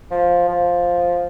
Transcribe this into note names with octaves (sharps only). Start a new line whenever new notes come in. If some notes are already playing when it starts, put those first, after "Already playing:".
F3
F3